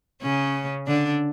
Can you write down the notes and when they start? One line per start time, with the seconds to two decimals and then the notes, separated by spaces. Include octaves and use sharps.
0.22 C#3 C#4
0.87 D3 D4